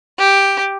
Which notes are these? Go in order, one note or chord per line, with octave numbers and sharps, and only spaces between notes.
G4